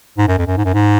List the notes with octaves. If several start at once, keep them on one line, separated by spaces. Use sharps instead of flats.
G#2
F#2
F2
F#2
G#2
F#2
G#2